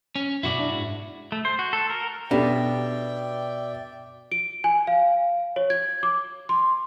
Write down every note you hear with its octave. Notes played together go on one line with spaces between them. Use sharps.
C#4
F#2 B2 E4 F#4 D5
D4
G#2
A3
C5
F#4
A4
A#4
B2 D4 G4 A4 D5 E5 G5
D7
G#5
F5
C#5
G#6
D6
C6